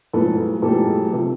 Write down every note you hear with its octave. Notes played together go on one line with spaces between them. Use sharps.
B1 A2 F3 G#3 A4 B4
B1 A2 F3 G#3 G4 A4
C3 F3